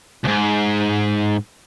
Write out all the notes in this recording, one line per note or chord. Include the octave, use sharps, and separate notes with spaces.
C#2 G#2